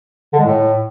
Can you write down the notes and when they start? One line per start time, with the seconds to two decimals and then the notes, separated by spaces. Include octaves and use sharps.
0.33 D3
0.39 G#3
0.45 A2